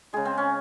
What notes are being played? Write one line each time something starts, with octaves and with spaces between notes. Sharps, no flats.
C#3 G#3 G#4
C4
C#4